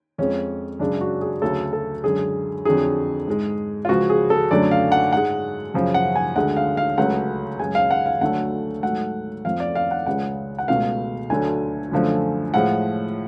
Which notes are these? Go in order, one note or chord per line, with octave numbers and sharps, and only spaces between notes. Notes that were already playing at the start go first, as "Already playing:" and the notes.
F2 F3 G#3 C#4
F#2 C#3 G#3 D4
F#4
G#4
D2 C#3 F#3 A4
A4
F#2 D3 G#3 G#4
F2 D3 F#3 G#4
G#2 G#3
F4
C#2 C#3 F3 F#4
G#4
A4
F#2 D3 F#3 A3 D5
F5
F#5
G#2 G#3 F#5
F#2 C#3 F3
F#5
G#5
D2 D3 G#3 F#5
F5
F5
C#2 C#3 F#3 A3 F#5
F#2 C#3 G#3 G#5
F5
F#5
F5
D2 D3 F#3 A3 F#5
G#2 F#3 A3 F#5
F2 F3 A3 F5
D5
F5
F#5
C#2 C#3 G#3 F#5
F#5
C#2 B2 A3 F5
D2 D3 F#3 A3 G#5
F#2 D3 F3 A3
A2 F3 G#3 F#5